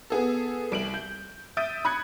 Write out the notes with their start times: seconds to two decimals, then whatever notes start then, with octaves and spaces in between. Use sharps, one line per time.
0.10 B3 G#4 A4
0.72 C2 D7 F#7
0.94 G6
1.57 E5 D#6 G6 A6 D7 D#7
1.85 B5 D#6 F#6 G#6 C#7